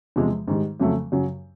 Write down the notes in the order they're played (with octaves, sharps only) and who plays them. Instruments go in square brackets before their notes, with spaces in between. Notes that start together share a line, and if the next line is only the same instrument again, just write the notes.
[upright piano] E2 C3 F3 G#3
G#2 D#3 G3
F2 C#3 F#3 A3
F#2 C#3 F#3